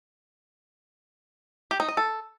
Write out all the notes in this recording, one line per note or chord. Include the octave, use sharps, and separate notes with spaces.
G4
D#4
D#5
A4